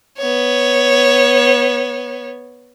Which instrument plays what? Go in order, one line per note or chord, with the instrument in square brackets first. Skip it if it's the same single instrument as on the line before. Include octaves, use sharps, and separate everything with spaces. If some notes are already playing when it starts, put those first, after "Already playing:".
[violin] B3 C#5